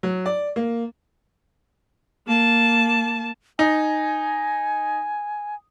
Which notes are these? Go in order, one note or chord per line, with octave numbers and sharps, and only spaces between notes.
F#3
D5
A#3
A#3 A5
D#4 G#5